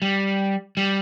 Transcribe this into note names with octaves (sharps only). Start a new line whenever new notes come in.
G3
G3